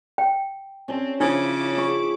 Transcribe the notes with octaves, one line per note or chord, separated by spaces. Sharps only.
G5
C4 C#4 D5 A5
C#3 F3 D4 E4 D6
F4 G#4 C#6